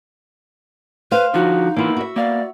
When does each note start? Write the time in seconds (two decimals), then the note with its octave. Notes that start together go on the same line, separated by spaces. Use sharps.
1.11 B4 C5 F5
1.34 D3 F3 D#4 F#4
1.77 E3 A#3 B3 E4 F4
1.97 F#4 E5
2.16 A#3 B3 D5 F5